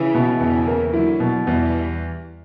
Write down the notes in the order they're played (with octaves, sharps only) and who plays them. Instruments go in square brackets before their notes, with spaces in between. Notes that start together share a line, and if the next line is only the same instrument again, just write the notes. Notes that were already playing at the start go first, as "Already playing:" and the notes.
Already playing: [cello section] C#3 E3 [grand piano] E4
[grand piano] B2
[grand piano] E2 [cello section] C#3 E3
[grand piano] A#3
[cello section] D3 F#3 [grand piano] E4
[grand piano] B2
[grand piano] E2 [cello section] E3 G3